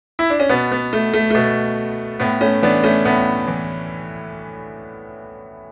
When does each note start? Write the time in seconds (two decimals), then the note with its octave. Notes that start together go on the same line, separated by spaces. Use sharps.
0.19 E4
0.30 D4
0.40 C#4
0.49 B2 B3
0.72 B3
0.93 A3
1.14 A3
1.30 B2 A3
2.20 A2 B3
2.41 A3 C#4
2.62 E3 B3 D4
2.83 A3 C#4
3.05 A2 B3
3.48 E3